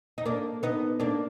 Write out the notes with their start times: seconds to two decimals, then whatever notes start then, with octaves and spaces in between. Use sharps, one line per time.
0.18 D#4
0.26 A#3 D4
0.63 B3 D#4
1.00 A#3 D4